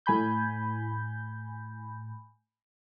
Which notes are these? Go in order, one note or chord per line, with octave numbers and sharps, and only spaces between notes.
A2 G#5 B5 G6